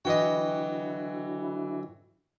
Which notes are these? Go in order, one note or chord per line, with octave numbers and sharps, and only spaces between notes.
D3 E3 F#3 E4 F#4 D#5 G5